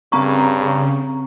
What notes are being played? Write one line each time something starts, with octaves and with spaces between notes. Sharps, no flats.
G2 C#3 C4 A#5 C#6